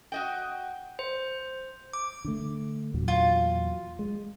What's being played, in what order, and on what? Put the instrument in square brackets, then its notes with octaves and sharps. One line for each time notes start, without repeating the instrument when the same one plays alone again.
[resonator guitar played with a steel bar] F#4 D#5 G5
[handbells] C5
D6
[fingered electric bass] D3 A3
E2 A#2 F#3
[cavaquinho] F4
[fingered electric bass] G#3